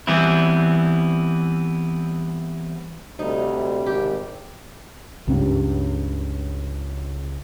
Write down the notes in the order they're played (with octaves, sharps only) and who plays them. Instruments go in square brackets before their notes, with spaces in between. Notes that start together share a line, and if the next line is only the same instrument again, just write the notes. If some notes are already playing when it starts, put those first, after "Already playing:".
[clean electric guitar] E3 G3 B3 C4 E4
[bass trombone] D2 [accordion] C3 G3 [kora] D#4
[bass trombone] G#1 [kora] G4
[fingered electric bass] C#2 [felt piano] G2 C#3